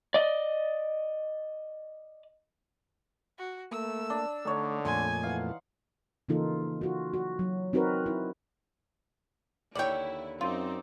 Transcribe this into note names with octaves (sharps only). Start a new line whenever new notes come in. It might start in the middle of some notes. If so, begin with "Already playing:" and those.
D5 D#5
F#4
A3 A#3 E6
D4
D3 A3 D#4 C#5
F2 A#2 A3 G#5 C6
E3 F5 F#5
C#3 E3 A#3 D#4 F4 A4
F4 F#4
F#4
F#3
C4 D#4 F#4 A#4 B4
E4
D#2 D3 E4 C#5 D5 G5
F#2 C4 D#4 F4 D5